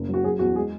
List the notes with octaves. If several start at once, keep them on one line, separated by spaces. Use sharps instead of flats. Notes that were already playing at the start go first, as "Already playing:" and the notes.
Already playing: F#1
F#3
F#4
F#3 G#4
E2 F#4
G#3 G#4